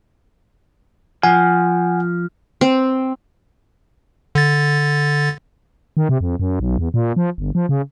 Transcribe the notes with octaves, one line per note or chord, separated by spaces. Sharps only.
F3 F#5 G#5
C4
D3 A6
D#3
C3
F2
F#2
B1
E2
A#2
F3
G1
F3
C#3